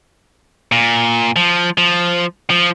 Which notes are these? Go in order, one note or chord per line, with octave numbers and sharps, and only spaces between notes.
A#2
F3
F3
F3